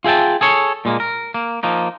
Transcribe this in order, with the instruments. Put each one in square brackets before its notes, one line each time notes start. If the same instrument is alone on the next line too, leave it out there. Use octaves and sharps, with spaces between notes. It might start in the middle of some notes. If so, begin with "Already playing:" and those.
[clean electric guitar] F4 G#4 E5 G5 A5
G#4 A4 C#5
A#2 G#3 A#3
A#4
A#3
F3 A#3 D#4